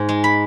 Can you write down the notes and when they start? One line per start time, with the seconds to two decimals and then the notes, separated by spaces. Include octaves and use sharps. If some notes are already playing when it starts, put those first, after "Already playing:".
Already playing: G#2
0.09 G#3
0.24 B5